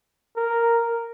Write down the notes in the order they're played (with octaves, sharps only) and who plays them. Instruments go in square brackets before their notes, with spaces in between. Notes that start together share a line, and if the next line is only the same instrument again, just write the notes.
[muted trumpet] A#4